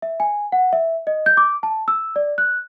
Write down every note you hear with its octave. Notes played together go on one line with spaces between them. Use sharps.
E5
G#5
F#5
E5
D#5
G6
D6
A5
E6
D5
F#6